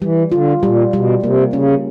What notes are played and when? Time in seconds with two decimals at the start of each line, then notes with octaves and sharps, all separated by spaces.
0.02 E3 G3
0.32 D3 F4
0.62 A#2 G3
0.93 B2 G3
1.23 C3 A#3
1.53 C#3 C#4